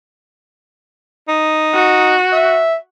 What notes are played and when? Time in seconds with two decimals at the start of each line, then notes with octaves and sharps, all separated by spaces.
1.28 D#4
1.75 F#4
2.32 E5